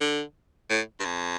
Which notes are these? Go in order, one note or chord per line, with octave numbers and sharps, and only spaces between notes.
D3
A2
G2
F2